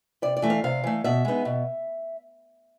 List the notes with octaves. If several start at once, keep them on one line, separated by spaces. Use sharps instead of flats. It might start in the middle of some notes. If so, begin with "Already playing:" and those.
C3 D5
D5
E3 A3
F5
C3 F5
E3 A3
B2 E5
G#3 B3 D#4
B2